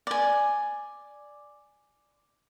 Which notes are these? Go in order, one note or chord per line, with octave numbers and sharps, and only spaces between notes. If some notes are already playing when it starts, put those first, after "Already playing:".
D5 G#5